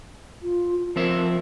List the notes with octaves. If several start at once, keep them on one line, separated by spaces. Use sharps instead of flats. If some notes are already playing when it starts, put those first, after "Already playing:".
F4
F3 C4 A#4 E5